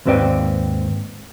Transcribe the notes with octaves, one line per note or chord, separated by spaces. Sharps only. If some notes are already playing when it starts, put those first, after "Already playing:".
D#2 G#2 C4 B4 D5 G5